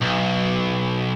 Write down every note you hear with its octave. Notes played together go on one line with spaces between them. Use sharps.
B1